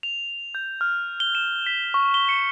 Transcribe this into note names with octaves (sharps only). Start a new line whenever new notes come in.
F7
G6
F6
G7
E7
B6
C#6
G7
C#7